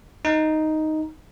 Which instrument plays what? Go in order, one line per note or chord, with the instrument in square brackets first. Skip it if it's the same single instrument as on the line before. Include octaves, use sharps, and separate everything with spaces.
[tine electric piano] D#4